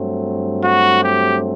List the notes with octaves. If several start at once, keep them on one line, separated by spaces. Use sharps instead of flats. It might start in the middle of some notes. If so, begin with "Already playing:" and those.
Already playing: G2 F#3 A3 C4
F#4
G4